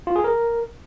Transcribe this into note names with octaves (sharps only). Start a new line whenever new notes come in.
F4
G#4
A#4